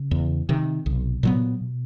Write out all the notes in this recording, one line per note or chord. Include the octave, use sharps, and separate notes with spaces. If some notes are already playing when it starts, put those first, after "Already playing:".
Already playing: C#3
E2
C3 D#3
B1 C3
A#2 F#3 B3
B2